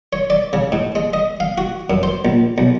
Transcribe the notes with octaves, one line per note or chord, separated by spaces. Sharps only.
C#5
D5
C#3
G#2
G#3
D#5
F5
F#4
F#2
C5
A#1
B1